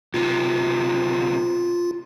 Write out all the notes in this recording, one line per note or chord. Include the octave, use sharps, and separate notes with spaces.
B1 C3 F4